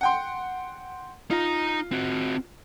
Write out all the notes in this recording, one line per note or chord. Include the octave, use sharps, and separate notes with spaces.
F#5 G5 C6
D#4 F4 A#5
C4 F#4